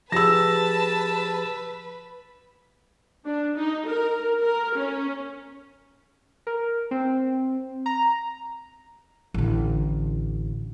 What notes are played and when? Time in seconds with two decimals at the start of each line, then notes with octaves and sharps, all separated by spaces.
0.12 F3 G4 G#4 B4 A5 E6 A#6
3.25 D4
3.56 D#4
3.87 A#4
4.41 A#4
4.76 C#4
6.47 A#4
6.91 C4
7.86 A#5
9.34 A1 D3